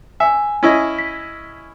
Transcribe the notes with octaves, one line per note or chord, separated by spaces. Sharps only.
E5 G#5
C#4 E4 D#5
B6